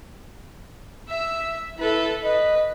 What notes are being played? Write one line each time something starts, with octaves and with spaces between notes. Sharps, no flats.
E5 E6
E4 A4 B4
B4 D#5